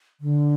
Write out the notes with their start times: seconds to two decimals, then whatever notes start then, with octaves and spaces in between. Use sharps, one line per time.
0.21 D3